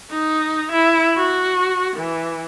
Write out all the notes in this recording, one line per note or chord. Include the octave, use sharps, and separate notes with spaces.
D#4
E4
F#4
E3